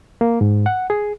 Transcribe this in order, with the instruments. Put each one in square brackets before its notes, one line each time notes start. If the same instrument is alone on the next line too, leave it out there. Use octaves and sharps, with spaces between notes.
[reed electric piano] A#3
G#2
F#5
G#4